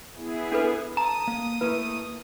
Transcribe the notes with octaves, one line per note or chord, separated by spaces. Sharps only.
B3 E4 G#4
D4 A4 B4
A5 A#5 D#6
A#3
A3 A#3 E4 B4